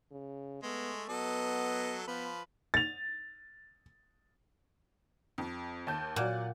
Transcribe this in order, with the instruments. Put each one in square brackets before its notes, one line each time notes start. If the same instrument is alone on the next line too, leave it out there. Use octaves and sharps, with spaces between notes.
[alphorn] C#3
[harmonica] G#3 A3 [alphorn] B3
[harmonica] F#3 A4 D#5 [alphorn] B3
[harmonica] F3 B4 [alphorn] B3
[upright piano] A6 F7
[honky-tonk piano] F2
D#2 A5 G6
[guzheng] A#2 [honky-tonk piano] F#3 D5 F#5